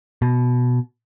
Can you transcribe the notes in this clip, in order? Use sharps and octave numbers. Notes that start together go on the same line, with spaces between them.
B2